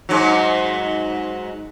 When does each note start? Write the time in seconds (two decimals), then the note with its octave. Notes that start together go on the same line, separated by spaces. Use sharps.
0.09 G#2 F#3